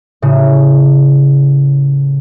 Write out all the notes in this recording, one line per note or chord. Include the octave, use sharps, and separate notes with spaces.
A2 C#3